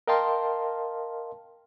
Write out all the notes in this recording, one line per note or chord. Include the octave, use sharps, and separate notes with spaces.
A#4 D#5 F5 G5 A5 C6